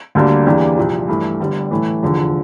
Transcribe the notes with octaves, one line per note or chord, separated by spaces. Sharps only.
D2 D3 G3 A#3 D4
E2 E3 A#3 D4 G4
C2 A#2 F3
G2 E3 A3
G1 G2 D3 G3
A2 E3 A3
F1 E2 D3 F3